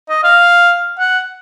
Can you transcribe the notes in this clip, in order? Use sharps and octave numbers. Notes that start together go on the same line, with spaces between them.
D#5
F5
F#5